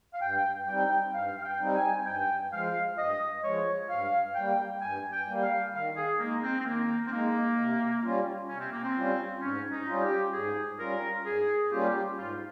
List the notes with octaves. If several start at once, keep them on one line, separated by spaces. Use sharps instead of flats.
F5
G2 G5
G3 C4 D#4 G5
G2 F5
F5
G5
G3 C4 D#4
G#5
G2 G5
F3 G#3 F5
G2 D#5
F3 G#3 C#5
G2 F5
G3 A#3 G5
G2 G#5
G5
G3 A#3
F5
D#3 F5
G#4
G#3 A#3 D#4
C4
C4
D#3 A#3
C4
G#3 A#3 D#4
C3
G3 C#4 F4
C3 C#4
C4
A#3
C4
G3 C#4 F4
G#2 C#4
D#4
G3 C#4 F4
G4
G#2 G#4
G3 C#4 F4 A#4
G#2 G#4
G3 A#3 C#4 F4 G4
G#2 F4